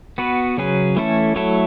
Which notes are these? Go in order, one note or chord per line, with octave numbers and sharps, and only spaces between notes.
B3 F#4 B4
C#3 F#3 C#4 G#4 B4
E3 A3 C#4 E4 A4
F#3 A3 E4 A4 C#5